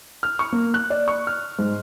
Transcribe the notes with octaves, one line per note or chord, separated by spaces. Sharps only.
F6
C#6
A#3
F#6
D5
C#6
F6
G#2